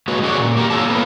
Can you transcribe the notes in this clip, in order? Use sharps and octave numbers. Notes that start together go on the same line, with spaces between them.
G#3 A#3 F#4 B4 C#5 D#5
C#4 F#4 G#4 A4 C5 D5
A#2
A#3 G4 A#4
C4 F4 A4 C#5 A5
A#3 B3